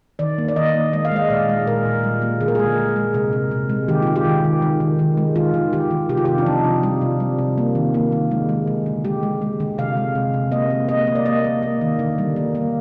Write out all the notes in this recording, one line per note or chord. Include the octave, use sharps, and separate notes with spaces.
D#3 D5
A#3
D5
D#3 D#5
A#3
G#3 D#5
F5
G#3 D#5
A#2 D5
G#3
A#2 A#4
A#2
G3
A#3
D3 G#4
A#4
G#3 G#4
G#3
G#3
C3 A#4
C3
C3
G#3
D#3 G4
G#3 F4
G4
D#3
D#3
D#3
D#3
D#3
G#3
D#3 F4
D#3
D#3 G4
D#3
C3 G4
F4
C3 G4
D4
F3 D#4
C3
G3 F4
C3
G3
C3
A#3
D#3
A#3
D#3
G#3
G#3
D3
D3
G#3 G4
G#3
G#3
D3
C3 F5
G#3
C3
C3
A#3 D#5
A#3
A#3 D#5
A#3
D5
A#3 D#5
A#3
A#3
D#3
D3
G3
A#3
A#3